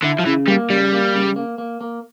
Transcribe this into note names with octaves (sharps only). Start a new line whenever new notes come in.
D3 E4
F3
C#3 E3
G3 A#3
C#3 G3
A#3
C#3
A#3
A#3
A#3